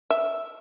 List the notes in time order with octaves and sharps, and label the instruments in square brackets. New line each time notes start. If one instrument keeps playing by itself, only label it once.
[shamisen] E5